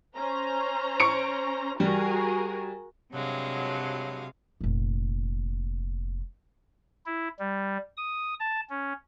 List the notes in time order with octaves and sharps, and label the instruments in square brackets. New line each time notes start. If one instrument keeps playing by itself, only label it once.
[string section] C#4 C5 A#5
[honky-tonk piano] C#6 C#7 D7
[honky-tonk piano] G3 [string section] F#4 G#4 A#4
[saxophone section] G2 F#3 [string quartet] C3 G#3 F5
[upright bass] F1 A#2
[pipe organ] E4
G3
D#6
A5
C#4